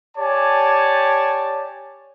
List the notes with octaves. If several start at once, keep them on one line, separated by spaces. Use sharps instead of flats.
G4 C#5 D5 G#5 A5